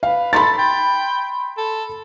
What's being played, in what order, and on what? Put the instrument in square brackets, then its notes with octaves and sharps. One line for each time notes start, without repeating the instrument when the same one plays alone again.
[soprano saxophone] B4 [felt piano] F5
[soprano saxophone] A4 [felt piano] B5 C6 A6
[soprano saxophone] G5
A4